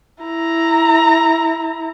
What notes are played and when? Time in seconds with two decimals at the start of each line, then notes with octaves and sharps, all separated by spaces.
0.24 E4 A#5